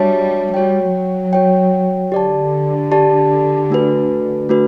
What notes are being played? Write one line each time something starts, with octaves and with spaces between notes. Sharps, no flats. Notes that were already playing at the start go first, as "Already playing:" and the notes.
Already playing: G3 D4 F#4 C#5 E5 A5
G3 F#4 C#5 G5
F#3
F#4 C#5 G5
D3 G4 D5 A5
G4 D5 A5
A3 D4 F#4 B4
A3 D4 F#4 B4